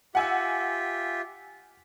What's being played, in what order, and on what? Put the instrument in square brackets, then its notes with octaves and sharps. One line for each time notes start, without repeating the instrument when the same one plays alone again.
[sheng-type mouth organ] F4 G4 E5 [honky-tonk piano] F#5 G#5 E6